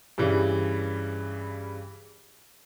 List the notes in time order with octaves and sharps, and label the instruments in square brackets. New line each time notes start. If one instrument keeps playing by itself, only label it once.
[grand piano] G2 C#3 E3 G3